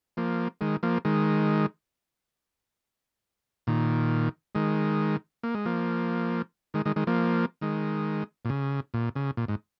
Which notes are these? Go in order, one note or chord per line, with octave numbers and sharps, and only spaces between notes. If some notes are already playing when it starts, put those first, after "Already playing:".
F3 A#3
D#3 G#3
F3 A#3
D#3 G#3
A#2 D#3
D#3 G#3
A#3
G#3
F3 A#3
D#3 G#3
D#3 G#3
D#3 G#3
F3 A#3
D#3 G#3
A#2
C#3
A#2
C#3
A#2
G#2